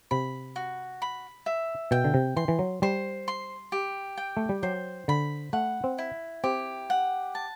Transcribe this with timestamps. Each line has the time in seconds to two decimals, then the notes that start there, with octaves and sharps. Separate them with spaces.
0.11 C3 B5
0.56 F#4
1.02 B5
1.46 E5
1.91 B2 G5
2.04 D3
2.14 C3
2.37 E3 C6
2.48 E3
2.59 F#3
2.82 G3 C5
3.28 C6
3.72 G4
4.17 G5
4.37 A3
4.49 G3
4.63 F#3 C5
5.08 D3 B5
5.53 A3 F#5
5.84 C4
5.98 E4
6.44 C4 G4
6.90 F#5
7.35 A5